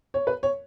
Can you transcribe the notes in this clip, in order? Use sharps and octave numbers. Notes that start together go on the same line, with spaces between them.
C#5
B4
C#5